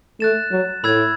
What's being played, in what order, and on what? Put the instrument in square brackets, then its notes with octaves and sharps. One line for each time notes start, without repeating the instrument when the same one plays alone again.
[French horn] A3 [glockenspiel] F#6 A6 E7
[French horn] F#3
[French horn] A2 [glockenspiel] B5 E6 G#6